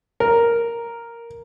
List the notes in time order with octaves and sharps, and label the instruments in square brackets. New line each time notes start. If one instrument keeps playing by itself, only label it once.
[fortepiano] A#4